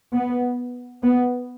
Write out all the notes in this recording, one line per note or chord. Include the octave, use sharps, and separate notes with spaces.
B3
B3